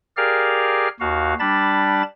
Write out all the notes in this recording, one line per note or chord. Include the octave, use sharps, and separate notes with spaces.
G4 G#4 A#4 D5 F5 F6
D#2 F#4 F5
G3 D4 A5 B5 A6